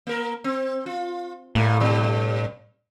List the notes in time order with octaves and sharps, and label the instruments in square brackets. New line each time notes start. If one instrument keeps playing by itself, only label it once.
[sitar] A#3 A#4
C4
F4
[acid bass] A2 [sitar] G3 A3 A#3
[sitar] G2 B2 G3